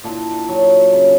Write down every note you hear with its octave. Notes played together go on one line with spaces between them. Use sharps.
A#2 D4 E4
F#3
C#3